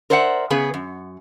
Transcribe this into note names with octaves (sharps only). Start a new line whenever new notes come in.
A#4 C5 D5 E5 F#5
C#3 B3 G#4 B4
F#2